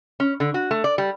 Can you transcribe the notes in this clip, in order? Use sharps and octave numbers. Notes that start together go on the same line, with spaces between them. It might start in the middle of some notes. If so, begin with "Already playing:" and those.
C#4
D3
F#4
A3
D5
G3